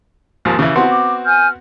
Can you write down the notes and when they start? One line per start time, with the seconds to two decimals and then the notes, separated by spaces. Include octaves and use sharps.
0.45 D#2 G#2 F3
0.59 C#3 E3
0.75 B3 C4 E4 F#4 A5 C6
0.89 D6
1.26 G#5 F6 G6